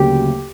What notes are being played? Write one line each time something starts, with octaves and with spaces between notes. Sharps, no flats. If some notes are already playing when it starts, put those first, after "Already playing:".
Already playing: D2 C#3 F#3 A#3 G4